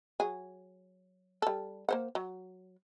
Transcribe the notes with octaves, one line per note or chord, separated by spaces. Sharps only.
F#3 G#4
G3 A4
A#3 C5 F#5
F#3